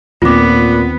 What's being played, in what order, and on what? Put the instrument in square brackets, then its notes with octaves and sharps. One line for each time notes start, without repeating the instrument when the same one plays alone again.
[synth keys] D#2 D#3 C4 [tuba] A#2 [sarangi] B3 [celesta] F4 D6